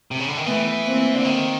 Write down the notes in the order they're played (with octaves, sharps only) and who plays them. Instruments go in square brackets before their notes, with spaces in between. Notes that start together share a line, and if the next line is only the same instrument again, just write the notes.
[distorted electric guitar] C3
C#3
D3
D#3
[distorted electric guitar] E3 [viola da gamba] A3 B3
[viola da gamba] A#3 C4
[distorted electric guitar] D3
D#3